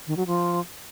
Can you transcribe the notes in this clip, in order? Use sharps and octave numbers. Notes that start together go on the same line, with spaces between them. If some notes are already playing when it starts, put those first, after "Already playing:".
D#3
F#3
F3